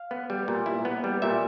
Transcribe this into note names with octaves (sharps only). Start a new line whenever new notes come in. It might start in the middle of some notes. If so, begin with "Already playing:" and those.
Already playing: F5
B3
G3
A#2
E4
B3
G3
A#2 E5